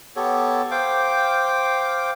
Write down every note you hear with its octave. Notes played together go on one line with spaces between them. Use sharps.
B3 G4 A4 C#5
C5 F5 G5 D6